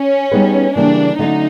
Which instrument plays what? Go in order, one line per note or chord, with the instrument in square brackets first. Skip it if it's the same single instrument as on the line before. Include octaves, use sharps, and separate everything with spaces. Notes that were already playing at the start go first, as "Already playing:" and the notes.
Already playing: [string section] C#4
[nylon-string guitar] G3 B3 D#4 G#4 B4
[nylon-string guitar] C#3 E3 G3 A#3 [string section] D4
[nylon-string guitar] D3 F#3 A3 C#4 [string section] D#4